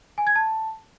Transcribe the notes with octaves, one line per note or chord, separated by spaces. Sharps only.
G#5
G#6
A5